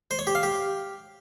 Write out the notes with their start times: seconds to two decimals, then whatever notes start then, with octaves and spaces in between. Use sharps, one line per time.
0.11 C5
0.19 C#5
0.27 G4
0.35 F5
0.43 G4